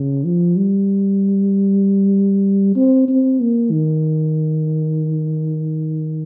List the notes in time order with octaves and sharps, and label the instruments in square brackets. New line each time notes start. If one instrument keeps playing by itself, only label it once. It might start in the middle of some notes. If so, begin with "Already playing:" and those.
Already playing: [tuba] C#3
F3
G3
C4
C4
A#3
D#3